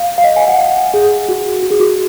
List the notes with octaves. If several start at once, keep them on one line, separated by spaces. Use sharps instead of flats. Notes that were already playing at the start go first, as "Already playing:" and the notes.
Already playing: F5
F5
D#5
G#5
F#5
F5
G#4
F#4
F#4
G#4
F#4